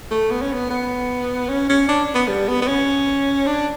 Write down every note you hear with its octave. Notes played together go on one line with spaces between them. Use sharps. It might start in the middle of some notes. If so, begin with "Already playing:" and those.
A3
B3
C#4
B3
B3
C#4
C#4
D4
B3
G3
B3
B3
C#4
D4